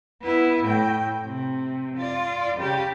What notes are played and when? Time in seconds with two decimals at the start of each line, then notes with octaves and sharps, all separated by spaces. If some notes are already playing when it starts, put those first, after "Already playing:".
0.23 B3 E4
0.64 A2 G5
1.24 C3
1.97 F4 D5
2.57 C#3 G4